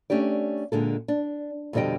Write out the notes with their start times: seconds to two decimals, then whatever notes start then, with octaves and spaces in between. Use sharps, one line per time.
0.10 A3 C#4 D4 G4 D5
0.72 A#2 D3 G#3 A4
1.08 D4
1.73 F2 B2 D3 G3 D#5 G5